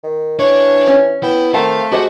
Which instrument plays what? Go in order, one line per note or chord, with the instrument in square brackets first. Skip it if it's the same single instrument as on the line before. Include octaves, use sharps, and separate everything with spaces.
[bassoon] D#3
[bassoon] E3 [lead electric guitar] D4 [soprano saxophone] C#5
[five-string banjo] C#4
[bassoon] B3 [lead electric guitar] E4 [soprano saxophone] G5
[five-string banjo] D#3 F#5 A5 [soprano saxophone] A3 [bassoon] C4 [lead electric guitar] F5
[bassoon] G#3 [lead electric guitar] F#4 [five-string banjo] G4 C5 F#5